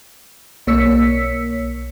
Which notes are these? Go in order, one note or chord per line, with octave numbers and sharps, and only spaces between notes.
B1 A#3 C#5 E6 B6 C#7